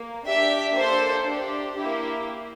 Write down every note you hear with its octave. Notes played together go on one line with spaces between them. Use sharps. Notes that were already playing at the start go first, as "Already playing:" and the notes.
Already playing: A#3
D4 G4 E5
A#3 D4 A4 C5
D4 G4
A#3 E4 G4